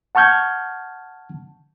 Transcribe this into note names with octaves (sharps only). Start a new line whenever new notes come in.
F#5 A5 C#6 F6 G6 G#6